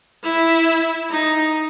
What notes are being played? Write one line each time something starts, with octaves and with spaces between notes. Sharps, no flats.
E4
D#4